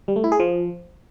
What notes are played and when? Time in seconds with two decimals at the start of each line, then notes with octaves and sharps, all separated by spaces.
0.08 G3
0.16 A3
0.24 E4
0.32 G#4
0.40 F3